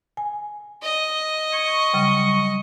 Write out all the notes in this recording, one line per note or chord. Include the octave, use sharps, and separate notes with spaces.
G#5
D#5
C#6
C#3 F#3 G3